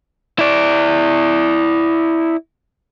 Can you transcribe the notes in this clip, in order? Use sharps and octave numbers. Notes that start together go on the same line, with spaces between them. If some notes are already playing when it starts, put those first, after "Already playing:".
E4 D5